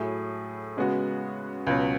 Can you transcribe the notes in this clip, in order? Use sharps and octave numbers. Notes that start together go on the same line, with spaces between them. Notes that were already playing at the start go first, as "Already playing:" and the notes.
Already playing: A2 F#3 A3 E4 G#4
C#3 G#3 B3 F#4
C#2 B2 F#3